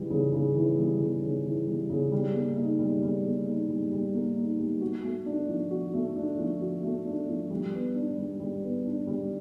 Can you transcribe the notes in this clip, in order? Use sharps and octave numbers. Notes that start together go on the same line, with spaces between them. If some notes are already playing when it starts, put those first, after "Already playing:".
Already playing: C#3 E3 G3
C#3
C#3
E3
G3
C#3
C#3
E3
G3
C#3
G3
A#3
D#4
G3
G3
A#3
D#4
G3
G3
A#3
D#4
G3
F#4
A3
D4
F3
F#4
A3
D4
F3
F#4
A3
D4
F3
G3
B3
D4
G3
G3
B3
D4
G3